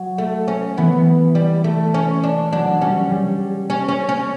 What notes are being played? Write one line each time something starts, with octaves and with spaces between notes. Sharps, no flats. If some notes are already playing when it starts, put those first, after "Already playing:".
Already playing: F#3
A3
C#4
E3 B3
G3
A3
C#4
D4
F#3 D4
G3 C#4
G3
C#4
C#4
C#4